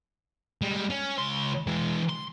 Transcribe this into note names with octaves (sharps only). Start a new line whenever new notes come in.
G3 G#3
C#4
C#2 C6
E3 G#3
C6